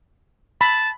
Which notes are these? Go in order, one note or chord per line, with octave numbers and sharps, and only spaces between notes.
A5 B5